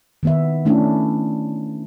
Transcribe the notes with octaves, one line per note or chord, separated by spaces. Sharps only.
D#3 B3 E5
A3 C#4 D4 E4